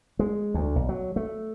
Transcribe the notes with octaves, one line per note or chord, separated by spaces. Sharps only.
G#3
D2
B1
F#3
A3